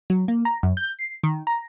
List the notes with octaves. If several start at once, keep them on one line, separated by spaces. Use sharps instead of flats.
F#3
A#3
A#5
F#2
G6
C7
D#3
A#5